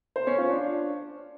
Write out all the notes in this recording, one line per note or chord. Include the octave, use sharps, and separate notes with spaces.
C5
C#4
F4
D4